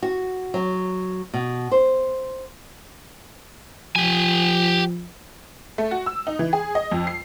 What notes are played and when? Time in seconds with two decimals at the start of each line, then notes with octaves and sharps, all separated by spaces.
0.03 F#4
0.54 F#3
1.34 B2
1.72 C5
3.96 F3 G4 G#5
5.78 A3
5.91 F#4
6.06 E6
6.27 D#4
6.39 E3
6.53 G#4
6.75 D#5
6.91 F2
7.07 C7